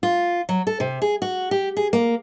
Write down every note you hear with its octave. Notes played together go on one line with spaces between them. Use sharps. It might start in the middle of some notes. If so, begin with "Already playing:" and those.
F4
F#3
A4
C3
G#4
F#4
G4
G#4
A#3